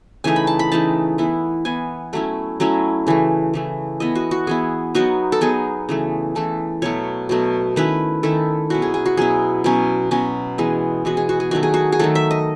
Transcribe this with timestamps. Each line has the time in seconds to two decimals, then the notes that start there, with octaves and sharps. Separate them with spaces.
0.24 C#3 E3 A3 D#4 G#5
0.36 B5
0.47 A5
0.59 B5
0.72 C#3 E3 A3 D#4 A5
1.18 E3 B3 E4
1.65 E3 B3 E4 G#5
2.13 F#3 A3 C#4 E4
2.60 F#3 A3 C#4 E4
3.07 C#3 E3 A3
3.54 C#3 E3 A3
4.00 E3 B3 E4 D#5
4.15 F#4
4.31 F#4
4.47 E3 B3 E4 G#4
4.95 F#3 B3 D#4 F#4
5.32 A4
5.41 F#3 B3 D#4 G#4
5.89 C#3 E3 A3
6.35 C#3 E3 A3 A4
6.82 B2 F#3 A3 C#5
7.29 B2 F#3 A3
7.76 D#3 A3 C#4 E4 B4
8.23 D#3 A3 C#4 E4 A4
8.70 B2 F#3 C#4 E4 F#4
8.82 G#4
8.94 G#4
9.06 F#4
9.17 B2 F#3 C#4 E4 G#4
9.64 B2 F#3 C#4
10.11 B2 F#3 C#4
10.58 E3 G#3 B3 G#4
11.05 E3 G#3 B3 F#4
11.17 G#4
11.29 F#4
11.40 G#4
11.51 D#3 F#3 A3 F#4
11.63 G#4
11.74 F#4
11.92 G#4
11.99 D#3 F#3 A3 A4
12.15 E5
12.31 D#5